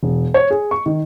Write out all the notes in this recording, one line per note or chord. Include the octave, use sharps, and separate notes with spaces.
E1
C#5
G#4
C#6
D#3